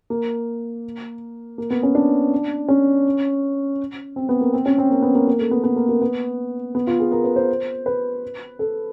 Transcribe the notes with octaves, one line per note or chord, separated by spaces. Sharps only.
A#3
A#3
B3
C#4
D4
C#4
C4
B3
A#3
C4
C#4
C4
A#3
B3
A#3
A#3
A3
B3
B3
A#3
A#3
B3
B3
F4
G#4
A#4
B4
C5
B4
A4